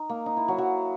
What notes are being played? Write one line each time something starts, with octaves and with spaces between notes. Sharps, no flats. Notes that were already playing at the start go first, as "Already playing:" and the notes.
Already playing: D#4
A#3
D#4
E4
F#3
F#3